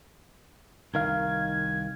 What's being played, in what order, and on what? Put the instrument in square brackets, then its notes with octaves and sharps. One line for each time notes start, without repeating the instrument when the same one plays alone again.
[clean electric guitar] C2 D#3 F5 [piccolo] G#6